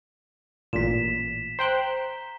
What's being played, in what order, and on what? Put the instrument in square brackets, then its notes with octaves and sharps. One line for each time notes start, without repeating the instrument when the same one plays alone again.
[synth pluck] A1 A#2 [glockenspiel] B6 E7
[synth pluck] C5 G5 F#6 [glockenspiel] A#5 G7